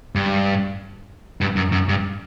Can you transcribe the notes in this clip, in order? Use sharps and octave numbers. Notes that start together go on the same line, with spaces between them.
G2
G2
F#2
F#2
G2